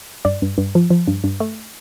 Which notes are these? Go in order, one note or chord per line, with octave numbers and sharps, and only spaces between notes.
G2 D5
G2
G2
F3
F3
G2
G2
A3